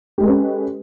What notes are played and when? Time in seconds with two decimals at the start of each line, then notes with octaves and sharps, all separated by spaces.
0.18 G4
0.20 G#3
0.23 A4
0.26 B4
0.28 C#4